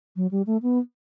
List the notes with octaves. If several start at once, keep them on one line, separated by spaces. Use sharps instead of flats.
F#3
G3
A3
B3